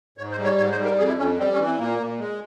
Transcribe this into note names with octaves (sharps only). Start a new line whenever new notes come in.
G#2 C#5
C5
G3
C#5
G#2 C#5
C5
G3
A#4
F2 G#4
E4
F2 C#4
G3 C4
C#4
E3
C4
A#2 A#3
A#2
G#3